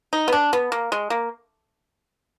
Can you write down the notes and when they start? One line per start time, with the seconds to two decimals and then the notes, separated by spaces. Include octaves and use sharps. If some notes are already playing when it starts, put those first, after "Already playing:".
0.13 D#4
0.28 B3
0.32 D4
0.53 B3
0.72 A#3
0.92 G#3
1.10 A#3